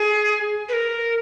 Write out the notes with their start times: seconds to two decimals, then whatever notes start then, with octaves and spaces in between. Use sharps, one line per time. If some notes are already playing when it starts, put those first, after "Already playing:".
Already playing: G#4
0.69 B4
0.73 A#4